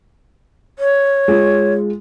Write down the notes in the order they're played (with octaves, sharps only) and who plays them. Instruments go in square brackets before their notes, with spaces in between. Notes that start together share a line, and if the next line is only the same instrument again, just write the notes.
[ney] C#5
[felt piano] G#3 F4